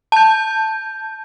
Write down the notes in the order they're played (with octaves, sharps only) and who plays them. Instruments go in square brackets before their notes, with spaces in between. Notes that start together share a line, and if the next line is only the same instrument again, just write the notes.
[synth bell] A5 G6